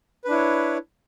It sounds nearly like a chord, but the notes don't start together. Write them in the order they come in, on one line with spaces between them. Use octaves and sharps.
B4 D4 E4 C#5